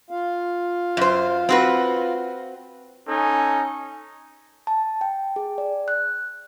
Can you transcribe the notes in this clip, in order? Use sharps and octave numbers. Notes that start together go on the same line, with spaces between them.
F4 F5
F#2 C5
C4 F#4 B4
C#4 D#4 A4 G#5
A5
G5
G#4
D5
F#6